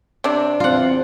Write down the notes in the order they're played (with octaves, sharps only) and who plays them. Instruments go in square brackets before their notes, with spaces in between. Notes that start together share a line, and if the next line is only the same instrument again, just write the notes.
[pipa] C3 D4
[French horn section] E2 C4 [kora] F4 F#5